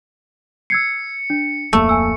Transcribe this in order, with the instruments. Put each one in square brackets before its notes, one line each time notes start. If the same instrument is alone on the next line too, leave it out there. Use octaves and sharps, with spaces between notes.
[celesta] E6 G#6 C7 [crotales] C#7
[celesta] D4
[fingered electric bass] D1 F2 A#3 [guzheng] A3 [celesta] E6
[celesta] G#5 E6